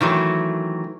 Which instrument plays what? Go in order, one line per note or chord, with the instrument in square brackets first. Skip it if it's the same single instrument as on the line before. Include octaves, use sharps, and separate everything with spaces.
[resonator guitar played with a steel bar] D#3 E3 F#3 A3